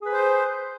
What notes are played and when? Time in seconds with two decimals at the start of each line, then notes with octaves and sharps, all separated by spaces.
0.01 G#4
0.06 B4
0.10 C5